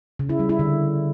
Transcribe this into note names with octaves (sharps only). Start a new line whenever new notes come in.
C#3
E4
G3
E4
D3